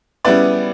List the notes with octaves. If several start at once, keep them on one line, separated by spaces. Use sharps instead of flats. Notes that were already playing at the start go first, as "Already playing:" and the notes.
C#3 G3 B3 E4 B4 D5